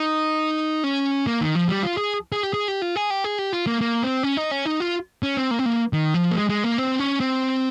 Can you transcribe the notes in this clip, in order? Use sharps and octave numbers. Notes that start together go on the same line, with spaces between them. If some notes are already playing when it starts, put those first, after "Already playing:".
Already playing: D#4
C#4
A#3
D#3
F3
G3
F4
G#4
G#4
G4
G#4
G4
F4
G#4
G4
G#4
G4
F4
A#3
A#3
C4
C#4
D#4
C#4
D#4
F4
C#4
C4
A#3
C4
A#3
D#3
F3
A#3
G#3
G#3
A#3
C4
C#4
C4